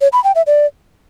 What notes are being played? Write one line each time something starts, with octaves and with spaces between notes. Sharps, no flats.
C#5
B5
G5
E5
D5